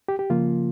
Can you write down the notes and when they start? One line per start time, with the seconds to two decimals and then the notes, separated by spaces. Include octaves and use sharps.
0.08 G4
0.19 G4
0.30 C#3 F3 A#3 F4